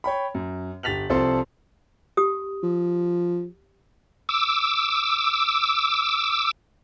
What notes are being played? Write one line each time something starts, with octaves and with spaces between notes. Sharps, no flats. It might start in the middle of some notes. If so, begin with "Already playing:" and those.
C#5 G5 B5
F#2
G1 G4 A6 B6 F7 F#7
C2 F3 C4 A4 A5 C6
G4 D#6
F3
D6 E6